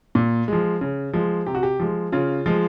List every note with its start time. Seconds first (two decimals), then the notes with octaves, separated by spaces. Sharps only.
0.15 A#2
0.48 F3 G#3
0.81 C#3
1.13 F3 G#3
1.47 C3 G4
1.55 F#4
1.63 G4
1.80 F3 G#3
2.12 C#3 F4
2.46 F3 G#3 F4